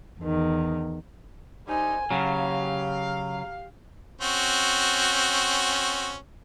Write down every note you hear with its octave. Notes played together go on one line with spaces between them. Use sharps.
E2 D#3
G3 D#4 C5 G#5
C#3 F#3 G4 F5
C4 C#4 F#4